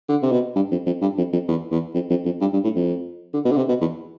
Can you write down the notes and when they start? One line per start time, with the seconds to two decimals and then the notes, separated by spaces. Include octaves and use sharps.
0.09 D3
0.22 C3
0.32 B2
0.56 G2
0.71 F2
0.86 F2
1.01 G2
1.17 F2
1.33 F2
1.48 E2
1.71 E2
1.94 F2
2.10 F2
2.25 F2
2.41 G2
2.53 G2
2.64 A2
2.76 F2
3.34 D3
3.45 B2
3.51 D3
3.57 C3
3.69 B2
3.81 E2